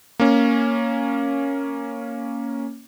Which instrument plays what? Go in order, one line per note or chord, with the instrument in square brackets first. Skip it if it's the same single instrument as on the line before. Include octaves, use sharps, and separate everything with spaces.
[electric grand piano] A#3 C#4